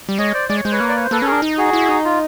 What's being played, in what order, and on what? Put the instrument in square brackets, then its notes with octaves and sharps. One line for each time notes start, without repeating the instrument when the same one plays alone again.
[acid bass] G3
[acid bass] G#3 [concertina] C#5 D#5
[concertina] C5 D5
[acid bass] G#3 [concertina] D5
[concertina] C#5
[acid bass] G#3 [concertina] C5
[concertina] B4 C#5
[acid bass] A#3
[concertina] D5
C#5
C5
[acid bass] A#3 [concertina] A4 B4
[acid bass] C#4 [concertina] A4
[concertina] G#4 A#4
[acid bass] D4
D#4
[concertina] F#4 G#4
[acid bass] E4
D#4
[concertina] F4